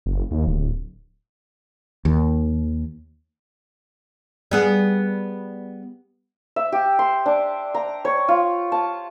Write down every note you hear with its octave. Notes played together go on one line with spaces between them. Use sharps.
F#1
D#2
D1
D#2
G3 B3 G#4
E5
G4
C6
D4
A#5
C#5
F4
A5